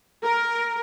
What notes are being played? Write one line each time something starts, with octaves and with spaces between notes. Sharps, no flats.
A#4